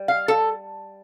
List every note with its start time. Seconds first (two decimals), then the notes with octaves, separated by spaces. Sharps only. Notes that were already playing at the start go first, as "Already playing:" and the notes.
Already playing: G3
0.08 F5
0.28 A4